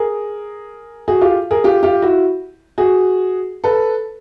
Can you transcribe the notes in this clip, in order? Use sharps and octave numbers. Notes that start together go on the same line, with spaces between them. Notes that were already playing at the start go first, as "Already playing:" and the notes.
Already playing: G#4 A#4
F#4 G#4
F4 G4
G#4 A#4
F4 G4
F4 G4
E4 F#4
F#4 G#4
A4 B4